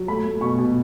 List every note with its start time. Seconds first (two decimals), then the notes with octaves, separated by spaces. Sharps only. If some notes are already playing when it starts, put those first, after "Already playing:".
Already playing: F#3
0.08 A3 B5
0.25 A3
0.41 B2 C#6
0.58 B2